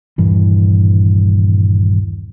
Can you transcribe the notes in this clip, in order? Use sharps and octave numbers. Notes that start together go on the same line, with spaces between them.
D#1 G2 E3